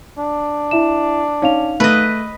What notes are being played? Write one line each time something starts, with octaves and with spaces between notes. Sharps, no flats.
D4
E4 E5 E7
C#4 D#4 F5 F7
A3 B4 D#5